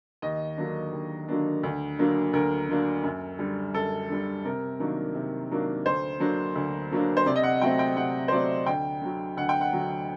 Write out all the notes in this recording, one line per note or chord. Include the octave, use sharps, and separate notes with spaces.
D#2 D#5
D3 F#3 A#3 D4
D#2
D3 F#3 A#3 D4
D2
D3 F#3 A#3 D4
D2 A#4
D3 F#3 A#3 D4
F#2
D3 G3
F#2 A4
D3 G3
C3 A#4
D#3 F#3 A#3 D4
C3
D#3 F#3 A#3 D4
D2 C5
D3 F#3 A#3 D4
D2
D3 F#3 A#3 D4
C5
C3 D5
D#5
F#5
F#3 A3 C4 G5
G5
C3 F#5
C5
F#3 A3 C4 D5
D2 G5
D3 F#3
D2 F#5
G5
F#5
D3 F#3